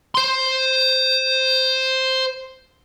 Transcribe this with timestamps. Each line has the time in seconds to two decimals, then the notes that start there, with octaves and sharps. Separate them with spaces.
0.15 C5 C6